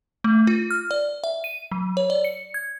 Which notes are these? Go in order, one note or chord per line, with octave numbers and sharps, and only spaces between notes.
A3
F4
F6
D5
E5
D#7
F#3
C#5
D5
C#7
G#6